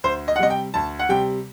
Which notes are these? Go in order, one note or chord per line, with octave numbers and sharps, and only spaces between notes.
D2 C5
D#5
F#5
C3 G3 D#5
G5
D2 A5
F#5
C3 G3 G5